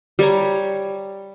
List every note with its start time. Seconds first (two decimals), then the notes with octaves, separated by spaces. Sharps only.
0.19 G3 C#5 A#5